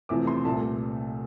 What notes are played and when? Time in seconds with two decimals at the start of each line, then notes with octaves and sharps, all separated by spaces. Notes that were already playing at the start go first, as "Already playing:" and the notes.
0.09 E2 C3 F3 A3 D6
0.27 C6
0.44 C2 A#2 A3 A5